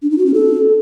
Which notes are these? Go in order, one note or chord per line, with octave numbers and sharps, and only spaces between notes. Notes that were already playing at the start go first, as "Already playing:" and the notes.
D4
D#4
F#4
C#4
A4